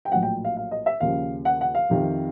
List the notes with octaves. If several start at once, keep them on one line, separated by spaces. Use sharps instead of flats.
G5
A#1 A2 F#3 F#5
G5
F5
F5
D#5
E5
D#2 C#3 F3 F5
F#5
F#5
F5
F2 C3 D#3